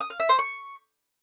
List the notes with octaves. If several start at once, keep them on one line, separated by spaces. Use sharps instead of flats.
D#6
F5
E5
C5
C#6